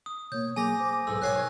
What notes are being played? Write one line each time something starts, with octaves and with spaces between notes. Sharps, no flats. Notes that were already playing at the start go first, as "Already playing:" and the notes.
D#6
B2 A#3 C#5 G6
F#3 A#3 G#4 G#5 A#5 D6 D#6 A#6
C5
B1 G#2 E6
B2 D#3 F#3 C#5 F5 G#5 F#6 C7